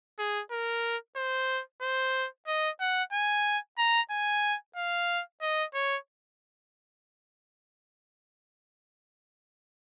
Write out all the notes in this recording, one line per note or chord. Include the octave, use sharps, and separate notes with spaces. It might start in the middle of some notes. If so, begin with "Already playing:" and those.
G#4
A#4
C5
C5
D#5
F#5
G#5
A#5
G#5
F5
D#5
C#5